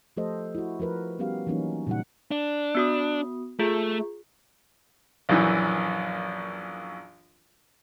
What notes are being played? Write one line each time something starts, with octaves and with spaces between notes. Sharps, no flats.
F3 A3 G4 A4 C5 D#5
E4 F#4
F3 F#4 A#4 B4
G3 B3 C#4 F#4 G4 F5
E3 F#3 A#3 C#4 D#4
A#2 C#3 G3 D#4 F#5
D4
B3 F#4 D#6
A3 F4 G#4
A#1 F#2 E3